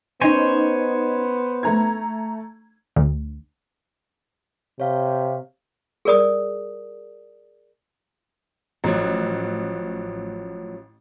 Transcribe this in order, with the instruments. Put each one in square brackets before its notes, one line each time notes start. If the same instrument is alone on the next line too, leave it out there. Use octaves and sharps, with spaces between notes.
[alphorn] B3 [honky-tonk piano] C#4 D#4 [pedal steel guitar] C5 C#5 G#5
[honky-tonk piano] A3 A#5 G#6
[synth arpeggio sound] D2
[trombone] C3 [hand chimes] C#5 F5
[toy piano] G#4 A#4 D5 D#6
[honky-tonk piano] A1 [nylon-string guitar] F3 F#3